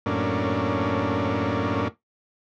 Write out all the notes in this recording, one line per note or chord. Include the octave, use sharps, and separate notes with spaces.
F#2 A2 A#3 C#4 D4